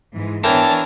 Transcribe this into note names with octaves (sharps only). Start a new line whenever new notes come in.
G#2 E3 G#3
E3 B3 D4 A#4 C#5 G5 A5